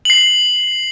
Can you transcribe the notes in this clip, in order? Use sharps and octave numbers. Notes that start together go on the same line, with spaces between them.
C7 F#7